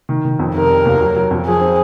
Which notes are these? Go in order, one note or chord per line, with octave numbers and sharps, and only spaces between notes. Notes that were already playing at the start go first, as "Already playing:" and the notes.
D#3
D#3
F2
F1 A#4
F1
D#2
F#3
F#3
F2
F3 G#4
C4